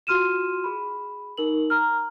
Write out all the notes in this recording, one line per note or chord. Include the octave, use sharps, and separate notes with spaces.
F4 F#4 C6 F6 D#7 E7
G#4 B5
D#4 A#4 F#7
A#5 F6